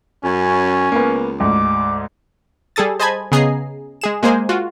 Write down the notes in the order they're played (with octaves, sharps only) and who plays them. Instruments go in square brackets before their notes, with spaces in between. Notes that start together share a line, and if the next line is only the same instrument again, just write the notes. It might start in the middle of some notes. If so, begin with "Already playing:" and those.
[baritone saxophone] F#2 [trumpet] C#4
[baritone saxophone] C#2 [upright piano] A#3 B3
[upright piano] D2 G#2 [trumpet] D6
[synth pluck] G3 G#4 A4 D#6 A6
C5 D#5 G#5 A5 B5 G#6
C#3 B3 G#4 D#5 A#5 C7
G#3 G#4 E7
G#3 A#3 G#4 C5 G#5
F4 F#4